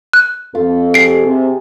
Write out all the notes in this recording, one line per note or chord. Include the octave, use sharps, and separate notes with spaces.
F#6
F2 F4 A4
G4 G#4 C7 D7
C3